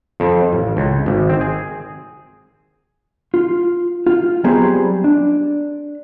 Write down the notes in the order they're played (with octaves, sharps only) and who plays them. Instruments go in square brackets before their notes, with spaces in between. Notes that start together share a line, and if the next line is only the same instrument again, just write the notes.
[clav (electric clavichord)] F2
A1
C#2
G#1
C4
G#4
[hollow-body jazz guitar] F4
F4
F#3 G3 B3 C4 G#4 C5
D4